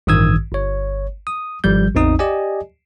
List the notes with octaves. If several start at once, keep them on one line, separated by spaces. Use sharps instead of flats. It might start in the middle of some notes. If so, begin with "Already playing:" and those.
A1 G2 D#3 D#6 E6 G#6
G1 C#5
D#6
G#1 F3 G3 G6
A1 E2 C4 D#4 D#6
G4 D5 D#5 G#5